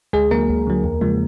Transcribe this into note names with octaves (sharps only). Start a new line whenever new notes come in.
D2 G#3 G#4
D3 F#3 A#3 A#4
D2
D3 F#3
E2
C#3 F3 G#3